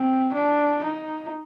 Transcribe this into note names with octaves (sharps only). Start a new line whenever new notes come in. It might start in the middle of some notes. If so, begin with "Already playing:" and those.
Already playing: C4
D4
D#4